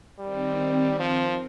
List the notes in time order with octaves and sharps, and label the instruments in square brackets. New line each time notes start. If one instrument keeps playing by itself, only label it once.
[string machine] D#3 C4 [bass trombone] G3
[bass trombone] F3